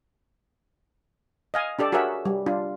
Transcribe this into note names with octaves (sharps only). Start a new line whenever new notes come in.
D#5 F5 G#5
D4 G4 A4 D5
F#4 G#4 A#4 C#5 E5 F#5
G3
D4 F4